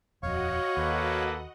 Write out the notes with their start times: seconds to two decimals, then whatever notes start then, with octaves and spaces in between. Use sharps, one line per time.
0.23 D#1 F2 F#4 C#5 D#5 F5 F#5 C#6
0.77 D#2 A#3 A4 B4